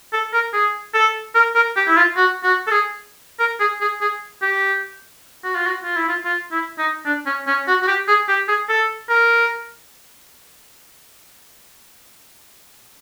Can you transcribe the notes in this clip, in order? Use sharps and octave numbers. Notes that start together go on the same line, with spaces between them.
A4
A#4
G#4
A4
A#4
A#4
G4
E4
F4
F#4
F#4
A4
G#4
A#4
G#4
G#4
G#4
G4
F#4
F4
F#4
F4
E4
F4
F4
E4
D#4
D4
C#4
C#4
F#4
F#4
G4
G#4
G4
G#4
A4
A#4